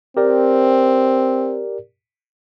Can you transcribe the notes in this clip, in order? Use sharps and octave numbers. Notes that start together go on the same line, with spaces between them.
C4 G4 A#4 D5